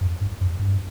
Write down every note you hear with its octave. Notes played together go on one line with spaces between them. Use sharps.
F#2
G2
F#2
G2